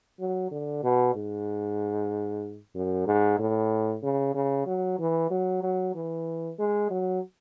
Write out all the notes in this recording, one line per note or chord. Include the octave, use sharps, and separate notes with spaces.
F#3
D3
B2
G#2
F#2
G#2
A2
C#3
C#3
F#3
E3
F#3
F#3
E3
G#3
F#3